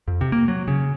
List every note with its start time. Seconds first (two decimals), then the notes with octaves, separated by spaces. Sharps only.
0.08 F2
0.21 C3
0.32 A#3
0.48 F#3
0.68 C#3